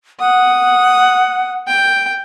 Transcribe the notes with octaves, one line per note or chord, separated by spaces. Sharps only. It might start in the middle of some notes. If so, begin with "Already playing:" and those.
F#5 D#6
G5